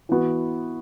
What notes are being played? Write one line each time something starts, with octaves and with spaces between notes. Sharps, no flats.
E3 B3 F#4